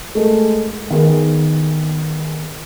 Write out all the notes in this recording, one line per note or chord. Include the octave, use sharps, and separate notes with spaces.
G#3 A3 A#4
D#3 B3 G#4 A#4